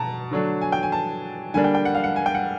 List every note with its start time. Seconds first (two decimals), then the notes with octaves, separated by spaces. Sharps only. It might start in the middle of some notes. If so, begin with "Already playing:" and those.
Already playing: B2 A5 A#5
0.31 D3 F#3 A3 D4
0.61 G#5
0.72 G5
0.83 G#5
0.92 A5
1.54 D3 G3 A#3 D4 G#5
1.64 G5
1.75 G5
1.85 F#5
1.95 F5
2.04 F#5
2.16 G#5
2.26 G5
2.35 F#5